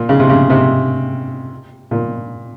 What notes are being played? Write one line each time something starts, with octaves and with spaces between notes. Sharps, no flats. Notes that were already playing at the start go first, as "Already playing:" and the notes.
Already playing: A#2
C#3
C3
C#3
C3
A#2